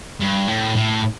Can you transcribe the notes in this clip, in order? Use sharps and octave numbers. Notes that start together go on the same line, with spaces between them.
G2
A2
A2